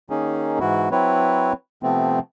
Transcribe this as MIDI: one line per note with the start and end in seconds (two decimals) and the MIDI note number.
0.10 0.59 51
0.10 0.59 58
0.10 0.59 61
0.10 0.59 63
0.10 0.59 68
0.60 0.89 44
0.60 0.89 52
0.60 0.89 64
0.60 0.89 66
0.91 1.53 54
0.91 1.53 60
0.91 1.53 64
0.91 1.53 71
0.91 1.53 73
1.83 2.19 48
1.83 2.19 53
1.83 2.19 57
1.83 2.19 59
1.83 2.19 60